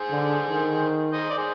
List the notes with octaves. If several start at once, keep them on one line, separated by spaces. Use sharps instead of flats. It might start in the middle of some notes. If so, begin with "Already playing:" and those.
Already playing: G#4 C5
D3
D#3
C5 D#5
D5
G#4 C5